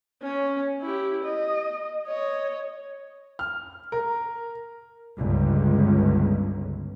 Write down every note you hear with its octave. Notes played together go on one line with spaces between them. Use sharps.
C#4
E4 G4
D#5
C#5 D#5
F6
A#4
G1 C#2